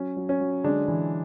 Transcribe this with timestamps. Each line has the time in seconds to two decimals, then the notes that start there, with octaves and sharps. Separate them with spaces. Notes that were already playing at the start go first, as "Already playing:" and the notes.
Already playing: F#3 C#4
0.17 F#3
0.29 C#4
0.41 F#3
0.64 D3 G#3 D4
0.88 E3